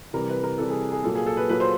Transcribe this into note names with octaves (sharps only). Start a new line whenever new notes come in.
C3 E3 G3 A#4
B4
A#4
C3 E3 G3 A4
G#4
G#4
A#2 F#3 A#3 A4
G#4
A4
B4
A#2 F#3 A#3 B4
C5